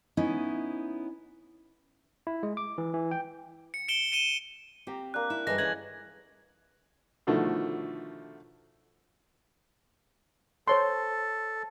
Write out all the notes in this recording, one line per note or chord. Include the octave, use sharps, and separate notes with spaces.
B3 C#4 D#4 E4
E4
G#3
D6
E3
E3
G5
C#7
C#7 D7 E7 G7
C#7 D#7 E7 G7
C4 G4 F5 A#5
A#3 D4 F#6
E4
G2 E3 G#3 A3 A#6
E3 C#4 G#4 G#6 F#7
B2 D3 D#3 F3 A3
A4 C5 C#5 C6